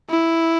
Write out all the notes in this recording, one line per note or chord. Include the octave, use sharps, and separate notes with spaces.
E4